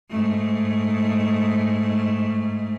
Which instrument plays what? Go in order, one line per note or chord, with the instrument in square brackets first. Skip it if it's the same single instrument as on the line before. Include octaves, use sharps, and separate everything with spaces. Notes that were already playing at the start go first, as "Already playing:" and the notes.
[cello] G#2 A3